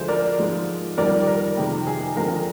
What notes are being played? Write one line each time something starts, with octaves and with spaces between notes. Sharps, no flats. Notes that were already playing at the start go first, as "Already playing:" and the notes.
Already playing: D2 D3 F3 G#3 G#4 C5
A#4 D5
G#2 F3 G#3
F2 D#3 G3 A#4 D5
A#4
F2 C3 D#3 G#3
G#4
F2 D3 G#3 A#4